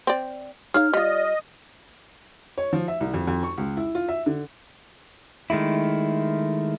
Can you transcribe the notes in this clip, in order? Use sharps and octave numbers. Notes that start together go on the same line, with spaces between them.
C4 D5
D#4 G#4 C#5 F5 F6
G3 F4 D5 D#5
C#5
F3
E5
C2
F2
F2
C#6
C#2
E4
F4
E5
D3
D#3 G#3 A3 E4